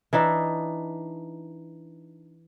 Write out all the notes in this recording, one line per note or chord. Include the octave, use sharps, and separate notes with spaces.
E3 D4 D#4 E5